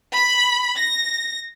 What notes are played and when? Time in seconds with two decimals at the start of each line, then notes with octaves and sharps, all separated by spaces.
0.13 B5
0.78 A#6